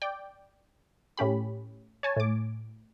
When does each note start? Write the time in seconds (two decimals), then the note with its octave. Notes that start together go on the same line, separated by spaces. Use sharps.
0.02 D5 G5
1.17 A2 C#4 G4 B5
2.03 C#5 G#5 A5
2.17 A2 D6